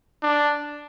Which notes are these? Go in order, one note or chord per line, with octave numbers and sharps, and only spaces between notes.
D4